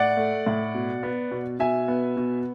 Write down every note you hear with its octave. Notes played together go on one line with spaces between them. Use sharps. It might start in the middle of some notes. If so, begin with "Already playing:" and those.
Already playing: A2 D5 F#5
A3
A2
B2
B3
B2
B2 E5 G#5
B3
B2